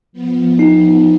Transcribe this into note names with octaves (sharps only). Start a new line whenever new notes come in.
F3 B3
D#4